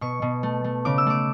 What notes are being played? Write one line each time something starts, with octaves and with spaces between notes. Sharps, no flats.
B2 C#6
B2
A3
A3
C#3 D6
E6
A3 D6